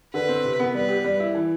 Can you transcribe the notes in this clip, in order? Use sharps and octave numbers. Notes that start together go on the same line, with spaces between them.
D3 B4
C4
C3
B3
G3 B4
G4
G3
E4
E3